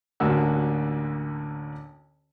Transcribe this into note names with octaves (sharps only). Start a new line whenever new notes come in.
A1 D2 D3 A#3 F#4 E6